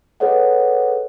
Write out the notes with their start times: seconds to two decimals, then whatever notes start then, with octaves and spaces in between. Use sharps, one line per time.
0.20 G#4 A4 B4 C#5 D#5 F#5